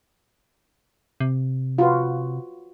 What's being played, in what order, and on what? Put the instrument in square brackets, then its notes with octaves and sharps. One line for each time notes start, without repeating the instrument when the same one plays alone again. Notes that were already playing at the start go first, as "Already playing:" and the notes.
[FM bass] C3
[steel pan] F4 F#4 B4